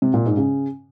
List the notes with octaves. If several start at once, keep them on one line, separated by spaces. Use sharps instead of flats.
C3
A#2
G#2
C#3